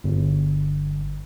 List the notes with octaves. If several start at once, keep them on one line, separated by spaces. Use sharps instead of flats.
G1